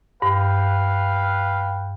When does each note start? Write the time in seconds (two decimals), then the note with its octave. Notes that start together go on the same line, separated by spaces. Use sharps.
0.22 G2 B4 F5 G5